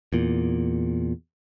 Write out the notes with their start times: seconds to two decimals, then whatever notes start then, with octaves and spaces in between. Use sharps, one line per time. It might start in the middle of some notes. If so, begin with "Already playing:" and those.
0.13 E2 A#2